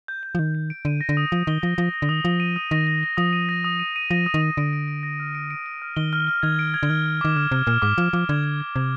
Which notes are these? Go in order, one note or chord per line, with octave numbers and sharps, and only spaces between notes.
G6
G6
F3
D#3 G6
G6
D7
D3 D#7
A#6
D3
D#6
F3 A#6
D#3 G7
F3 A#6
F3 A#6
A#6
D3
D#3 D#6
F3 A#6
D#7
D#6
D#3 A#6
A#6
A#6
F3 D#6
D#7
A#6
D#6
D#7
D#7
F3 A#6
D#6
D#3
D#6
D3 D7
D7
D7
A#6
F6
D7
D7
D7
F6
D#3 G7
F6
F6
D#3 G#6
D7
G#6
D3
D#3 F6
F6
D#3 D6
D3 F6
C3 F6
A#2 F6
G#2 D6
F3 G#6
F3 D6
D3 G#6
G#6
G#6
C3 G#6